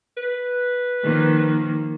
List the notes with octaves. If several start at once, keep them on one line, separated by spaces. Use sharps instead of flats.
B4
D#3 F3 A#3